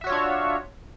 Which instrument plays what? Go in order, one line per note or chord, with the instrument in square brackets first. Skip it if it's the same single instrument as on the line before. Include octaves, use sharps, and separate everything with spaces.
[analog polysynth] E5
F#4
C#5
F4
D4